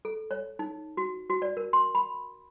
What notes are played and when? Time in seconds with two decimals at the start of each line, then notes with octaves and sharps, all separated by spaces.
0.05 A4
0.31 C#5
0.59 D#4
0.97 F#4
1.30 F#4
1.42 D5
1.57 A#4
1.73 C6
1.95 B5